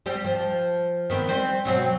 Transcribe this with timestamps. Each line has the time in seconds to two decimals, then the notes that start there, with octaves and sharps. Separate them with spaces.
0.06 G3 C4 G4
0.24 F3
1.10 D#3 B3 C4
1.29 G3 C4 C5
1.65 B2 F#3 C4